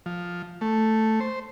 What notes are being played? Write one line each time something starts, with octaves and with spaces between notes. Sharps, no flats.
F3
A3
C5